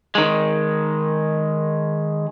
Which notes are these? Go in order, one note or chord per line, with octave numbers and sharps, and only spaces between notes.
D#3 G#3